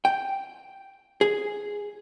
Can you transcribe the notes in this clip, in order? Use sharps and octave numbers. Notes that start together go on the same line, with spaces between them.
G5
G#4